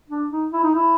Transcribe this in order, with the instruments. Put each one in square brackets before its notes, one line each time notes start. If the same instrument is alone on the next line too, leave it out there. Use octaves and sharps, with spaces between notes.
[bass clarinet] D4
D#4
E4
D#4
E4